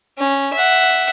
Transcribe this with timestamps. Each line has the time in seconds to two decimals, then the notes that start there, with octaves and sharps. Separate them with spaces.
0.18 C#4
0.53 E5 F#5